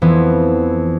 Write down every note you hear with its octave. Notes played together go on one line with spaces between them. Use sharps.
F2 E3 B3